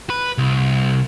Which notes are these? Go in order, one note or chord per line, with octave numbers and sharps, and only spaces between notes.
B4
C2